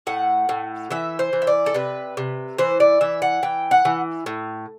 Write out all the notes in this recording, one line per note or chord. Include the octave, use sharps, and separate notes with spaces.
A2 F#5
A2
E3 E5
C5
E3
E5
D5
A4
C3 B4
C3
E3 C5
D5
E3 E5
F#5
E3 G5
F#5
E3
A2